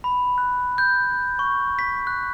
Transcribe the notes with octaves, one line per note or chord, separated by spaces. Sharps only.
B5
F#6
G6
C#6
B6
F#6